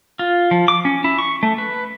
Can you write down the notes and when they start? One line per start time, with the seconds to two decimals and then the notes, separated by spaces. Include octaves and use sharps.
0.19 F4
0.51 F3
0.68 D6
0.85 C#4
1.04 E4
1.19 C#6
1.43 A3
1.58 B4